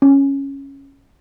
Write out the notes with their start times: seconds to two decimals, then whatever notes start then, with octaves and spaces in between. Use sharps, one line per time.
0.02 C#4